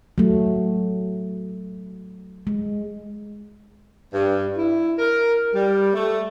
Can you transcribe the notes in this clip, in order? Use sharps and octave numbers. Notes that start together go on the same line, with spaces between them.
F#3 A3
G#3
G2
E4
A#4
G3
A3